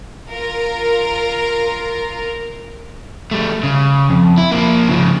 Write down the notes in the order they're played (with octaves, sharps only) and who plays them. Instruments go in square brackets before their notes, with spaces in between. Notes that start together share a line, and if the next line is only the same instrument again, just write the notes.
[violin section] F4 A#4
[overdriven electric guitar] G3 A3
C#3
F2
E4
F3 A#3
C#3 F3